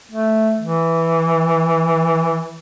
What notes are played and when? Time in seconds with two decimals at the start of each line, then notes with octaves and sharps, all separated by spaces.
0.12 A3
0.61 E3